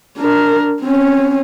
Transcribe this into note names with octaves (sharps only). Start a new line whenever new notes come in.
D4 A#4
C4 C#4